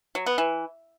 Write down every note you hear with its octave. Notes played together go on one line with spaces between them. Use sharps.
F#3
B3
E3